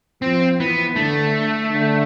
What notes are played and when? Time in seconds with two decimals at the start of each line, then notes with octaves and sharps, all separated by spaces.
0.22 F3 C4
0.59 E3 B3
0.96 D3 A3
1.70 D3